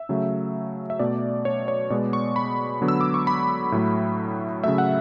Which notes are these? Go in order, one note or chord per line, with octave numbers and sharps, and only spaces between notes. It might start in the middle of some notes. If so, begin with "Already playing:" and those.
Already playing: E5
C#3 F#3 A3
E5
B2 A3 D5
C#5
C#5
B2 G#3 B3 D5
C#6
B5
D3 F#3 B3
E6
D6
C#6
B5
A2 F#3 A3
C#3 F#3 A3 E5
F#5